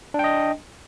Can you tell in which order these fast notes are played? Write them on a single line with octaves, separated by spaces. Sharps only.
D4 G5 D#5